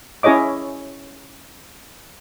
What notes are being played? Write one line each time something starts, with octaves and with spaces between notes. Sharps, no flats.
C#4 E4 G#4 C#5 D#5 D6